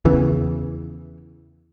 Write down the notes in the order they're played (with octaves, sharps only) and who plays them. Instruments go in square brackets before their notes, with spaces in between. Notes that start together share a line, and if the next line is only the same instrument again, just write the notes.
[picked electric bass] E2 C#3 E3